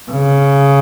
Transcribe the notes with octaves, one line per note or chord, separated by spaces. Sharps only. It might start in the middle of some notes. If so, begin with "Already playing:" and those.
C#3